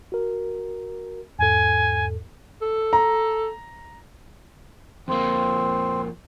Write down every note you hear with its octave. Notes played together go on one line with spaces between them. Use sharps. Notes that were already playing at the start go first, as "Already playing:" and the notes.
F#4 A#4
E2 G#2 A4 G#5
A4
A#5
F2 A#3 C4